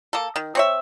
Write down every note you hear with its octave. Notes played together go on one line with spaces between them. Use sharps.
A#3 A4
D#3
C4 C#5 E5